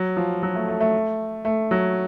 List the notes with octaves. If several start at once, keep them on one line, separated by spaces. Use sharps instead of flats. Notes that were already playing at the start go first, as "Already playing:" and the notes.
Already playing: F#3
F3
F#3
A3
A3
A3
A3
F#3